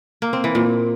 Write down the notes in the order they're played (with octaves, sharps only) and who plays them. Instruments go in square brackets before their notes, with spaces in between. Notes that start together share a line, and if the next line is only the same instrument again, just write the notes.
[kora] A#3
C4
E3
A#2